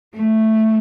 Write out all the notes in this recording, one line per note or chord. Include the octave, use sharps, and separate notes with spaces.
A3